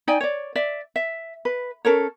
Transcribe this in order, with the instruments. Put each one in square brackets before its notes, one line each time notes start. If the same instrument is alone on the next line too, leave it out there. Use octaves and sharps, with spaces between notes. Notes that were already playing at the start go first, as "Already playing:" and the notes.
[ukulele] D#4 D5 G5 G#5
C#5 D5
D5 E5
E5
B4
C#4 A4 A#4 C#5